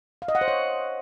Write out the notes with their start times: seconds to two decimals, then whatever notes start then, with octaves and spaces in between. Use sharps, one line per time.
0.22 F5
0.28 D#5
0.35 F#5
0.41 C5
0.48 C#5